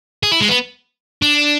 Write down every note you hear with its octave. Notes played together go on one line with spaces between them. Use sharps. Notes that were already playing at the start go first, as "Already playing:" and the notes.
G#4
E4
G#3
B3
D4